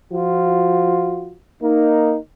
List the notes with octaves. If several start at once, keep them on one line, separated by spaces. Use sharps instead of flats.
F3 F4 F#4
A#3 D#4